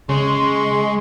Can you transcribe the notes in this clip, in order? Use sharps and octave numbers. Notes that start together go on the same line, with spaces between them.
C#3 G#3 C6 C#6